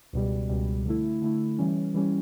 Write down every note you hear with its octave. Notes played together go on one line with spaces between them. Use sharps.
C#2 B2 G3
C#2 B2 G3
D3 A3 E4
D3 A3 E4
E3 G3 C#4
E3 G3 C#4